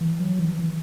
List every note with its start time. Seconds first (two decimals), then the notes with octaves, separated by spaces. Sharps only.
0.01 E3
0.20 F#3
0.39 E3
0.59 E3